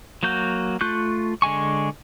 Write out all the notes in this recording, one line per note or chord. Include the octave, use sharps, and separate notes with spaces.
F#3 A#3 F#4 G6
A3 F4 C#6 F#6 G6
D3 G#3 G#5 C#6